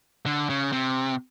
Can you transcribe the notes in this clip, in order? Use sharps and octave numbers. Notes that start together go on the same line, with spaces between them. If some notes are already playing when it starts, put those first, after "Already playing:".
D3
C#3
C3